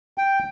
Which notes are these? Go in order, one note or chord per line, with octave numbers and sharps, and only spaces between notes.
G5